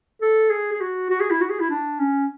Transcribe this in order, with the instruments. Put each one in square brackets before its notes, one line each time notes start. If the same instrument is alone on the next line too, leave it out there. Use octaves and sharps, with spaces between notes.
[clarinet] A4
G#4
G#4
F#4
F#4
G#4
E4
F#4
G#4
E4
D4
C#4